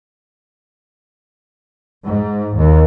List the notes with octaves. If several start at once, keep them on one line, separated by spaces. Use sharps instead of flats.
G#2
D#2